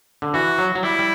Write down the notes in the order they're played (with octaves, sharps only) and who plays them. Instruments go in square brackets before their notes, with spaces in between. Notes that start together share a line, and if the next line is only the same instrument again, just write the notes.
[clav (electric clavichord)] D3
[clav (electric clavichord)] E3 [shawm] F#4
[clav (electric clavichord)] F#3
F#3
[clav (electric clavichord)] G3 [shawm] E4
[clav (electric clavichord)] G3